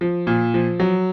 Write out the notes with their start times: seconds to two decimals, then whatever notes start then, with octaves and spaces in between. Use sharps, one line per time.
0.01 F3
0.27 A#2
0.54 F3
0.80 F#3